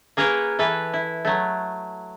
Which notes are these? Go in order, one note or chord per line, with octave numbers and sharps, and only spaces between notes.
A#3 G#4 A#4 B4 C#5
E3 A4 B4
E4
F#3 A3